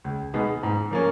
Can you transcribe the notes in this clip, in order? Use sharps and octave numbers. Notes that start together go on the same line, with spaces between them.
C#2
B2 G#3 B3 D#4
G#2
F3 A#3 C#4